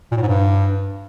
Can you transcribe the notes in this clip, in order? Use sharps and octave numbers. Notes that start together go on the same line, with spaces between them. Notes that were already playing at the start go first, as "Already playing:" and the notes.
A#2
A2
G#2
G2